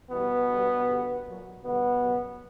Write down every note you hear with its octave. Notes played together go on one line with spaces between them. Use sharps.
F#2 B2 E3 G3 B3
D2 D3 G3
G2 D3 G3
A#2 F#3
D2 B2 D3 G3 B3
F#2 C#3 G3